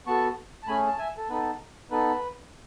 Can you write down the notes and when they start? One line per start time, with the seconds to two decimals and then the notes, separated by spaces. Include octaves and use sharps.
0.06 B3 F#4 A4 A5 C#6
0.63 A5
0.67 A3 C#4 G#4 G#5 B5
0.87 A5
0.98 E5 G#5
1.17 A4
1.29 B3 D#4 A4 B4
1.91 B3 D#4 A4 B4